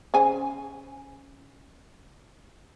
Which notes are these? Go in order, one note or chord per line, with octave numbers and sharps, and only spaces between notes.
C#3 C5 G#5